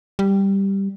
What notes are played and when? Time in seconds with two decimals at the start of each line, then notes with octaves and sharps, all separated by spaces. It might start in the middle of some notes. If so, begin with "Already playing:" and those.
0.19 G3